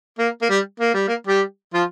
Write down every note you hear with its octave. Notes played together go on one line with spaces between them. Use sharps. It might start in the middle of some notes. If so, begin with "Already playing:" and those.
A#3
A#3
G3
A#3
G3
A#3
G3 G4
F3 F4